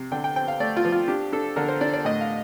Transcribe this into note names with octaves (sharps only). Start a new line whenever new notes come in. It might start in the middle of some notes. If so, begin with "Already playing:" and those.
Already playing: C3
D3 G5
G5
C4 G5
F5
A3 D5
F4
F3
F4
D4 G4
D4 A4
D3 A#4
C5
D4 D5
D5
A2 D#5
F5